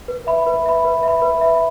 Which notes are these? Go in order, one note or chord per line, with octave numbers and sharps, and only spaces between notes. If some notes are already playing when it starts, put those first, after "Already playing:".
B4
E5 B5
B4
E5 B5
B4
E5 B5
B4
E5 B5